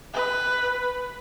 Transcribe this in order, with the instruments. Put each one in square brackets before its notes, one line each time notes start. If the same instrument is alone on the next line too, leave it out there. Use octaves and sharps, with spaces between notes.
[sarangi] B4